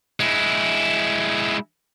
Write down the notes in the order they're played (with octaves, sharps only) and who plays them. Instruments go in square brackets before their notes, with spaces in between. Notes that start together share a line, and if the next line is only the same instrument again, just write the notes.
[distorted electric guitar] G#3 E4